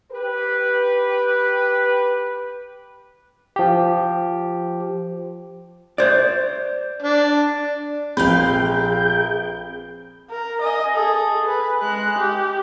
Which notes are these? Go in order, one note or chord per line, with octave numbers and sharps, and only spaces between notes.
G4 B4
F3 G4
C5 D5
D4
A#1 C4 G#4 B4 F5 G5 B5 G6
A#4
D#5 G#5
G#4 A4
B4
G#3 F#6
G4